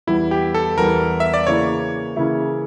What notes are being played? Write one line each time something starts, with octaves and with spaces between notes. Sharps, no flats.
E2 E3 G3 E4
G4
A4
E2 E3 G3 A#4
E5
D5
C#3 E3 A#3 E4 C#5
C#3 E3 A#3 E4